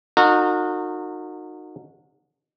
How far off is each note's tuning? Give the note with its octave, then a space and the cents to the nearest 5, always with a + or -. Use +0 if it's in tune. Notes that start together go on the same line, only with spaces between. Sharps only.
D#4 -20 F#4 -30 A#4 -35